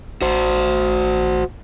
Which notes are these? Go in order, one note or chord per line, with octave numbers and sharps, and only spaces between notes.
A1 F#4 C5